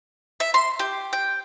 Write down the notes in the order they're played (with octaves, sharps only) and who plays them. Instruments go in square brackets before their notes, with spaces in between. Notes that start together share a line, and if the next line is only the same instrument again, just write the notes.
[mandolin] E5
C6
G4
G5